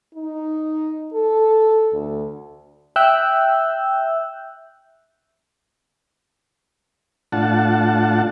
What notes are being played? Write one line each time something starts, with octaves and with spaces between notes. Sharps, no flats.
D#4
A4
D2
E5 G5 E6 F#6 G6
A2 D4 F4 F#5 A5